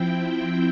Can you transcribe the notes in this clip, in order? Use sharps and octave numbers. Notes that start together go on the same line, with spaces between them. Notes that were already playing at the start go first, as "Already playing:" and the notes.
Already playing: F3 C4 E4 G5